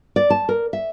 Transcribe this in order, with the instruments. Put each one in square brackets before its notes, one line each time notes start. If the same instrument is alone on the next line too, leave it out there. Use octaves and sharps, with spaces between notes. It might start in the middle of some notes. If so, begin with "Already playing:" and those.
[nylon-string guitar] D5
A5
A#4
E5